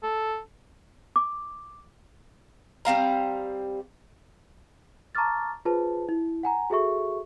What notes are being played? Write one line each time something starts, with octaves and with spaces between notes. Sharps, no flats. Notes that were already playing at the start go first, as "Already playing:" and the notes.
A4
D6
G3 C4 F5 A#5
A5 A#5 C#6 D6 F6 A6
F4 G#4 B4 C5 A5
E4
F#5 G#5 A#5
F#4 G#4 A4 E5 C#6